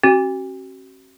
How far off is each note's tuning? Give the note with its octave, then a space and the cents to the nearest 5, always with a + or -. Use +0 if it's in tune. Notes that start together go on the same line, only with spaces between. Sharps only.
C#4 -45 F#4 +35